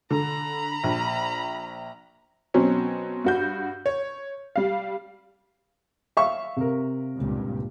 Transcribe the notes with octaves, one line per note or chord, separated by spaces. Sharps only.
D3 A#5 B5
A#1
B2 F#3 C4 C#4
G2 F#4 G6
C#5
G3 F5
E5 F5 C#6
C3 A#4
C#2 G2 A#2